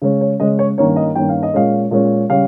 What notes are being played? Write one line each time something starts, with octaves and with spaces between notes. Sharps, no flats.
C#3 G#3 C#4
C#5
C#3 G#3 C#4 D#5
C#5
G2 D#3 A#3 C#4 C#5
D#5
G2 D#3 A#3 C#4 G5
F5
D#5
A#2 G#3 C#4 F5
A#2 G#3 C#4
C#3 G3 C#4 F5